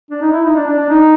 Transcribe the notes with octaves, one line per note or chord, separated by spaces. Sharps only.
D4
D#4
E4
D#4
D4
D4
D4
D#4